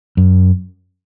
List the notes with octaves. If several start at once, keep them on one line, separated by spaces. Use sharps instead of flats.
F#2